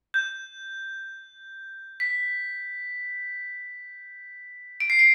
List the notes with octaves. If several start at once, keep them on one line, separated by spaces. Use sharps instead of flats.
G6
B6
D7
C7
D7